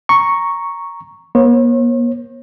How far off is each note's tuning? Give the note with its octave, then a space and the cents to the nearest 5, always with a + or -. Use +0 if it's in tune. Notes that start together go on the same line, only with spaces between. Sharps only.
A#5 +0 C#6 +0
A#3 +45 C#5 -40